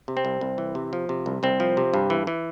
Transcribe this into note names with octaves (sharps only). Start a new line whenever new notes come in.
C3
C4
C2
C2
E3
C3
F3
C3
C2
C2 C4
F3
C3
G2
E3
E3